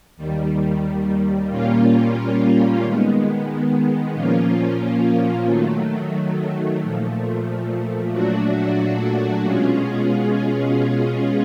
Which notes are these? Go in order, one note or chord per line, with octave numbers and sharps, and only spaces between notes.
D#2 D#3 G3
A#2 G3 A#3 C#4 F4
D#3 G#3 B3
A#2 F3 A#3 C#4 F4
D#3 F#3 A3
A#2 F3 A3
A#2 F#3 A3 D4 F#4
B2 G#3 C#4 F4 G#4